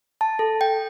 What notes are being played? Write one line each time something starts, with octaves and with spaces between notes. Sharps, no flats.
A5
A4
G5